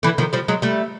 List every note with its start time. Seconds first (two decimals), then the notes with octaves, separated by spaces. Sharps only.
0.03 D3 E3
0.18 D#3 F3
0.33 F3 G3
0.48 F#3 G#3
0.62 G3 A3